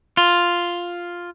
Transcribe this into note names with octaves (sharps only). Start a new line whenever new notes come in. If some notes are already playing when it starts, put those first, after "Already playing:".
F4